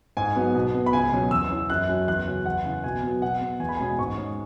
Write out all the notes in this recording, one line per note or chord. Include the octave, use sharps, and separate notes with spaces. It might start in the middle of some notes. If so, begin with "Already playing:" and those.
G#2 G#5
F#3 B3
B2
B3
B5
C#2 G#5
B2 F#3 C#4
E2 E6
E3 C#4
F#2 F#6
F#3 C#4
E2 F#6
C#3 F#3 C#4
E2 F#5
C#3 E3
B2 G#5
F#3 B3
B2 F#5
B3
E2 G#5
B5
B2 G#3 C#4 G#5
G#2 C#6
G#3 C#4